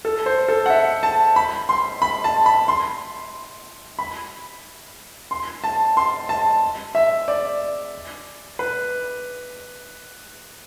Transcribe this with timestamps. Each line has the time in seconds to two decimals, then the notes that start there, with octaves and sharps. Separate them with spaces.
0.05 A4
0.26 C5
0.48 A4
0.66 F#5
0.70 E5
1.03 A5
1.36 B5
1.69 C6
2.02 B5
2.24 A5
2.46 B5
2.68 C6
3.99 B5
5.31 C6
5.64 A5
5.97 C6
6.29 A5
6.95 E5
7.28 D5
8.59 B4